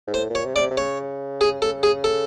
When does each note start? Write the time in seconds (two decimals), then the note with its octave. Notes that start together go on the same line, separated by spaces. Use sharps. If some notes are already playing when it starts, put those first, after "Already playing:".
0.08 G#2
0.13 A2 C5
0.30 A#2
0.35 C#5
0.45 C3
0.54 C#3 D5
0.61 C3
0.71 C3
0.77 C#3 C#5
1.41 G#4
1.62 A4
1.83 G#4
2.04 A4